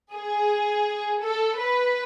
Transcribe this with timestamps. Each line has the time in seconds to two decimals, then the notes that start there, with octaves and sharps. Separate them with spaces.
0.14 G#4
1.21 A4
1.57 B4